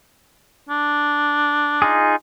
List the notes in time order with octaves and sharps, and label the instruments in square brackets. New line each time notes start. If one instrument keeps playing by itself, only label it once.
[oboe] D4
[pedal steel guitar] D#4 F4 G#4